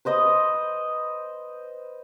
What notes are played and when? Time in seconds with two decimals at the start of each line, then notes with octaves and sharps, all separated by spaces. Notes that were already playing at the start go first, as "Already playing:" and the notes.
0.05 B4 C5 D#5 D#6